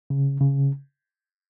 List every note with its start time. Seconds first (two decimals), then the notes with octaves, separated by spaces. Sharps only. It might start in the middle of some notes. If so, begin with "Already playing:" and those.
0.10 C#3
0.40 C#3